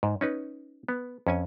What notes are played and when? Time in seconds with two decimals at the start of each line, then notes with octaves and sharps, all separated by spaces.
0.03 G#2
0.21 C#4 D#4 B4
0.89 B3
1.27 F2 C#4 G#5